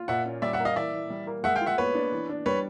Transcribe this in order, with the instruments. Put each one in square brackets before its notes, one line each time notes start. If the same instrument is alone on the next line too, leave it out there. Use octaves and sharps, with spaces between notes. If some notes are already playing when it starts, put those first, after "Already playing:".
Already playing: [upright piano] F4
[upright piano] A#2 [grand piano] E5 F#5
[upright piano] C#4
[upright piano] G3 [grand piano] D5 E5
[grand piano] E5 F#5
[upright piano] A#3
[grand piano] D#5 F5
[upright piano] E3 [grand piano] D5 E5
[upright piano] E3
G3
A#3
[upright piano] G#3 [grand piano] E5 F#5
[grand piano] F5 G5
[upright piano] F4
[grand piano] E5 F#5
[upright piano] B3 [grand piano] B4 C#5
[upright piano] D4
E3
D4
[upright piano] G3 [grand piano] B4 C#5